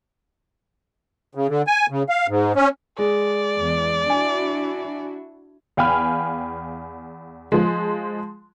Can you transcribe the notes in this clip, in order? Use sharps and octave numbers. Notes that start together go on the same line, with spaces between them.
C#3
D3
G#5
C#3
F5
G#2
C#4
G#3 D5
E2
D4 E4 F#4 G#5
E2 F5 G5 G#5 B5 F6
F3 G#3